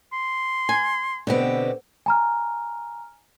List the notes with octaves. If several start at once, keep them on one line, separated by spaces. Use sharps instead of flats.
C6
G#5
B2 D3 B3 C4 G4
G#5 A#5 F6